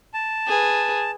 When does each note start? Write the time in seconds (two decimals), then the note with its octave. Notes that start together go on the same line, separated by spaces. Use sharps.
0.14 A5
0.47 G#4 B4